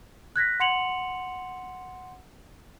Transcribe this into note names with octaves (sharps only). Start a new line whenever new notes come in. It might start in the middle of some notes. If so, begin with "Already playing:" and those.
F#6 G#6 A#6 B6
F#5 C6 C#7 F7 F#7